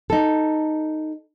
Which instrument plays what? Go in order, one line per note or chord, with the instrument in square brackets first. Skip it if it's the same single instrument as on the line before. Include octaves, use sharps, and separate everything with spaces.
[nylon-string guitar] D#4 A4